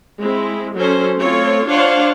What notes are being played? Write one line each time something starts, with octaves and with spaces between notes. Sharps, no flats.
G#3 C4 E4
F#3 C#4 A4 C5
A3 C4 F4 A4 C#5
D4 F4 C5 C#5 F5 F#5